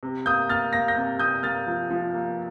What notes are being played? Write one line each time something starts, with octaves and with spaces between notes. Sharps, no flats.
C3
A#3 D#6 G6
A#3 F6 A6
A#3 A#6
G6 A#6
C3
C3 D#6 G6
A#3 F6 A6
F3
F3
A#3